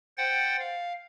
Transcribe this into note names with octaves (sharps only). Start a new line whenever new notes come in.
C5 F#5 G5 A6
F5